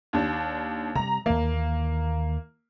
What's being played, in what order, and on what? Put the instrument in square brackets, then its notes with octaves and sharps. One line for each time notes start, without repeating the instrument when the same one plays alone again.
[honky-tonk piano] D#2 D4
[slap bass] C3 G3 [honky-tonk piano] A#5
[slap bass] D#2 E3 [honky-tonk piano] A#3